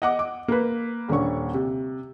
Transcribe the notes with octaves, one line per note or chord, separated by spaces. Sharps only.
D#5 F#5 D6
D6
A#3 B4
D#1 D3 C#4 C#6
C3